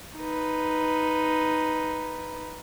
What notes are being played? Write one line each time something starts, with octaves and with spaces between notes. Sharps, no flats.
D#4 B4